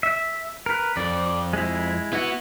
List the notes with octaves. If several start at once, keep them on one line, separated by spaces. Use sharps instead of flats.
E5
A#4 B4
F2 D5
G#3 E4
B3 E4 F#4